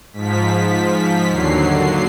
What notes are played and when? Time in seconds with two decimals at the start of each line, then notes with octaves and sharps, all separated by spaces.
0.13 G#2 F3 B6
1.29 D#2 D3 F#3 C7